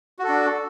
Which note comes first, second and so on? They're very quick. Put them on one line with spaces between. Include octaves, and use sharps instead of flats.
F#4 A4 D4